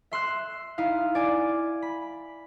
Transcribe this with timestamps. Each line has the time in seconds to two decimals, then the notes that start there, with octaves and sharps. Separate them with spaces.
0.11 E5 C6 E6 F#6
0.78 D#4 E4 F5
1.15 D5 G#5
1.82 B5